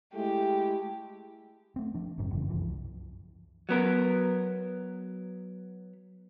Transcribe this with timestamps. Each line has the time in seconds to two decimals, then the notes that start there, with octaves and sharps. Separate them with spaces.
0.14 G#3 A3 E4 G4
1.76 A3 C4
1.94 F3 D4
2.18 G1 F#2 A2 C#3
2.31 F#1 G2 C#3 E3
2.49 C2 F#2 E3 F3
3.69 F#3 B3 A#4